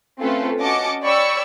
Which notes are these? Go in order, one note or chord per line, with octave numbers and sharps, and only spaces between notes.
A3 C4 C#4 F4 A4 B4
C#4 F#4 D#5 A5 D6 C#7
C#5 D5 G5 B5 C#6 E6